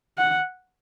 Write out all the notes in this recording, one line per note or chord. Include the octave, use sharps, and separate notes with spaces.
F#5